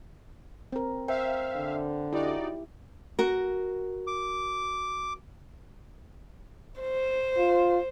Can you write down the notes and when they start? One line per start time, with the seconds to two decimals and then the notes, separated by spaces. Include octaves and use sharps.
0.72 C4 A#4
1.08 C5 E5 F5 G5
1.56 D3
2.13 D#4 E4 F#4 G4 D5
3.19 F#4 A#4
4.07 D6
6.81 C5
7.38 F4